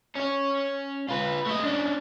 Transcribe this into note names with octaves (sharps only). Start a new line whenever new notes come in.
C#4 C#5
F4 B4
A3 D#5
C#4 D4